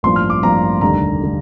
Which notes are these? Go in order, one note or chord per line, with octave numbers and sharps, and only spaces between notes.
A1 G2 F3 A#3 C6
F6
D6
A1 G2 F3 A#3 A#5
F1 D#2 D3 G3 A#5
D3 G3